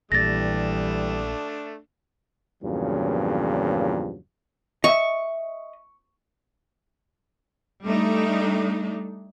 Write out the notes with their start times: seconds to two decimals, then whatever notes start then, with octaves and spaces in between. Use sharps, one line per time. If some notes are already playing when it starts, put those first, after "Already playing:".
0.12 A#1 A#2 E3 G3 A3 D4 A6 A#6
2.62 E2 G2 A#2 C#3 F3 F#3
4.84 D#5 E5 C#6
7.85 G3 A3 D4 D#4